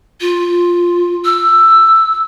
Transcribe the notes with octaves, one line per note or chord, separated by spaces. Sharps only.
F4
E6